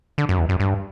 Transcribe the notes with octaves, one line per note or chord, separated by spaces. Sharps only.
D3
F#2
E2
F#2
G2